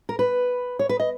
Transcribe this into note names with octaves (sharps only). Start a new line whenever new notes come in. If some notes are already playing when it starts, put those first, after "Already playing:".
A#4
B4
C#5
B4
D#5